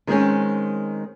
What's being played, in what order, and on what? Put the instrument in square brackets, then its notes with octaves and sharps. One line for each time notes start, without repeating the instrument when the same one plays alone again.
[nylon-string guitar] D#3 G#3 C4 C#4